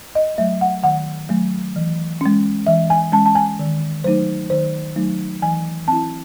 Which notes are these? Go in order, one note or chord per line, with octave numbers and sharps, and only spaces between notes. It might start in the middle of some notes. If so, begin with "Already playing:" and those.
D#5
F#3 A3 E5
F#5
D#3 F#5
F#3 A3
E3
G#3 C#4
E3 E5
G#5
G#3 C#4 A5
A5
G#5
D#3
F#3 A3 D#4 C5
D#3 C5
F#3 A3 D#4
E3 G#5
C4 E4 A5